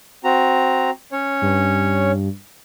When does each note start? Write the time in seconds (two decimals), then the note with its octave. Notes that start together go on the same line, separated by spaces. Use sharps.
0.24 C4 F#4 A#5
1.12 C#4 C#5
1.42 G2